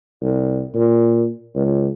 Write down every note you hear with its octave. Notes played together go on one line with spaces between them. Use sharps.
C2
A#2
C#2